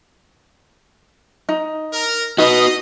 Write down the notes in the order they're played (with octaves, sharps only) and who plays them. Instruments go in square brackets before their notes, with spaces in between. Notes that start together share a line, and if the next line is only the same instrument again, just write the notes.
[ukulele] D#4
[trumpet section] A#4
[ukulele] D#4 [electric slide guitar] F#4 B4 [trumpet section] D#5